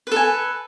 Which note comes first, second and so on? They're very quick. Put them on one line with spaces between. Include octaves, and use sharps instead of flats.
B4 A4 G#5